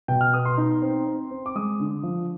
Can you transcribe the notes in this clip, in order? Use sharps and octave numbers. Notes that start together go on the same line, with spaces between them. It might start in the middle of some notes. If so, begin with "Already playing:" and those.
B2 G5
F6
B3 D#6
C6
D#4
C4
C4
C4
D6
G#3 D#6
D3
F3